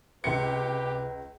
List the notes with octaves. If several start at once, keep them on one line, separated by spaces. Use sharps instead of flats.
C#2 C3 G4 B4 C#7